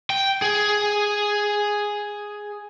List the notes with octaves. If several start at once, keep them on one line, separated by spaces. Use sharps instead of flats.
G5
G#4